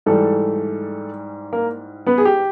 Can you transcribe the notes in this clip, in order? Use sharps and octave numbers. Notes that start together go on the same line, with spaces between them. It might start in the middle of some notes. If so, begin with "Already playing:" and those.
G#2 E3 G3 A3 A4
A#3 A#4
B3 B4
G#4
G4